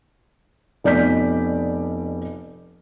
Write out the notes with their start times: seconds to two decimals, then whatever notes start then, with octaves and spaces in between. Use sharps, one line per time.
0.84 F1 B2 D5 D#5 G6 B6